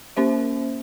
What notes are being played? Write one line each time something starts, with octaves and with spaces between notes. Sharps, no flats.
A#3 C#4 C5 E5